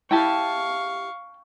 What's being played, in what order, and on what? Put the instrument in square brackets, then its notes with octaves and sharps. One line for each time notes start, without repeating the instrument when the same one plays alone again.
[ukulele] E4 G4 [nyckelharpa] F5 C#6 [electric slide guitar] G5 A5